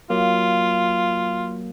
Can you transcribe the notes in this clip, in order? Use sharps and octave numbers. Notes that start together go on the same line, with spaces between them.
F#3 A#3 F4